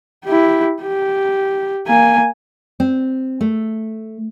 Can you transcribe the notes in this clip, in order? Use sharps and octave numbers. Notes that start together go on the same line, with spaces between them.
E4 G4
G4
A#3 G#5
C4
A3